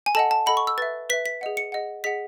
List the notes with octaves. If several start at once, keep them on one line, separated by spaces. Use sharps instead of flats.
G#5
A4 D#5 F#5 A5
A5
A4 D#5 F#5 B5
C#6
E6
B4 E5 A6
B4 E5 B6
B6
G#4 D#5 F#5
C#7
G#4 D#5 F#5
G#4 D#5 F#5 B6